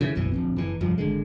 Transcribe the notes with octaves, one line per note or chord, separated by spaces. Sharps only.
C#3 E3
F#1 B1 F#2 E3
D1 A#1 C4
F#1 E3
F1 G2 F3
G#1 D3 G#3